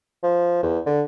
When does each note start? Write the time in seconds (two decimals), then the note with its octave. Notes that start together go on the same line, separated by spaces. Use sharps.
0.23 F3
0.63 E2
0.86 D3